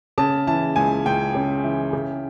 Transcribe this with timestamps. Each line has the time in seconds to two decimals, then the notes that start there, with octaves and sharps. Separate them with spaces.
0.18 C#3 A5
0.47 E3 A5
0.76 C#2 G#5
1.06 C#2 G5
1.35 C#3
1.64 E3
1.93 C#3